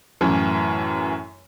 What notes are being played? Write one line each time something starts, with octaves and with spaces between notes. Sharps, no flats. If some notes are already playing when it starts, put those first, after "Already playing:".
F#2 A2 E3